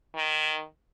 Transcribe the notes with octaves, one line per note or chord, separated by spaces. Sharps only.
D#3